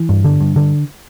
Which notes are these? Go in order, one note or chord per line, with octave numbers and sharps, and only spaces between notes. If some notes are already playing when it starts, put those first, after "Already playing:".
Already playing: E3
G2
D3
G2
D3